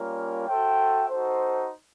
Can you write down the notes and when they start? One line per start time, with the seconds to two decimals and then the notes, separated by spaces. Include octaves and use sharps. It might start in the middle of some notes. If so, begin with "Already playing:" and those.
Already playing: G3 A#3 C#4 F4 A#4
0.47 F#4 A4 C5 E5 G5
1.09 D#4 F#4 A4 C5